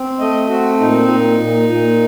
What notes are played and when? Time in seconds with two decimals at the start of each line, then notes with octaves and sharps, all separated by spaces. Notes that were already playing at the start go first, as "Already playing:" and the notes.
Already playing: C4
0.19 A3 D#5
0.49 C4 F#4
0.79 A#2 D#4
1.09 A#2
1.39 A#2
1.69 A#2